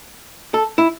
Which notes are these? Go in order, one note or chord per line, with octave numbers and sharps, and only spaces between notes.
A4
E4